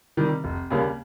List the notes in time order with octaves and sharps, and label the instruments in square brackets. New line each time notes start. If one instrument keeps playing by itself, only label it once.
[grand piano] C3 D#3 G3
F1
D#2 C#3 G3 A#3